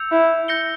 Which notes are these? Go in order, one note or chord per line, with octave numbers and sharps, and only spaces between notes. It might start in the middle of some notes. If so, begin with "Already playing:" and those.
Already playing: E6 G6 C#7 F7
E4
G6 A#6 C#7 G7